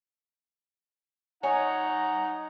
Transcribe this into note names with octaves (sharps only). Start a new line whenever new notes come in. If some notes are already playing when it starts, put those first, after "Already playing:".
D#4 C#5 F#5 G#5 A#5